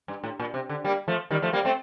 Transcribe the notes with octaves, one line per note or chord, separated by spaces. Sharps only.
G2
A2
A#2
C3
D3
G3 A#3
F3 A3
D#3 G3
F3 A3
G3 A#3
A3 C4